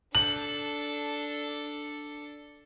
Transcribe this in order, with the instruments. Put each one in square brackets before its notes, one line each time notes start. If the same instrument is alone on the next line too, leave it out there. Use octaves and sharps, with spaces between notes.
[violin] D4 A4 [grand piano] F#7